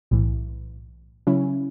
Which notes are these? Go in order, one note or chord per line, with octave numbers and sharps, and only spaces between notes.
B1 A2 E3
C#3 F#3 C#4 E4